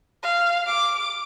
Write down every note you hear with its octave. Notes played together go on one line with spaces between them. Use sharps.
F5
D6